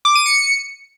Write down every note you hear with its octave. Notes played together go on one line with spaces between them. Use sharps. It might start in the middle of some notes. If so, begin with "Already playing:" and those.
D6
D#7
C#7